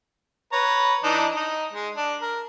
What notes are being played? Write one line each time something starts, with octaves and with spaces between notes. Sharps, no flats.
B4 C#5 A#5
E3 D4 D#4
D#4
G#3
D4
A#4